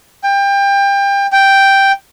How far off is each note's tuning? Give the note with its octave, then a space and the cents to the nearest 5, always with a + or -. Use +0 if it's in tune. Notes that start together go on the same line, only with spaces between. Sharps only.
G5 +25
G5 +0